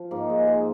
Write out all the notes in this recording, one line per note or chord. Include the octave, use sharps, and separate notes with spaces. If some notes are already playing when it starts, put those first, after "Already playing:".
Already playing: F3
G#2 A#3
G#3
G#3